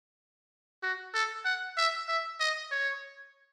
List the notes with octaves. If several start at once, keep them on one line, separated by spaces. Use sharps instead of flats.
F#4
A4
F#5
E5
E5
D#5
C#5